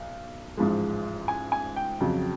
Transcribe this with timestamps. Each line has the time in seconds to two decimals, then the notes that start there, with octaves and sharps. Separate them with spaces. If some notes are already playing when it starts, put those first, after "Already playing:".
Already playing: B1
0.57 A1 G#2 F3 G#3
1.28 G#5
1.52 G#5
1.76 G5
2.00 F2 C#3 F#3